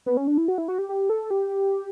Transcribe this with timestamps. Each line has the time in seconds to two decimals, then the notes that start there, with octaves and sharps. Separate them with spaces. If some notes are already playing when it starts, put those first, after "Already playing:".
0.06 B3
0.17 C#4
0.27 D4
0.38 E4
0.48 F#4
0.58 E4
0.68 F#4
0.78 G4
0.89 G4
1.10 A4
1.30 G4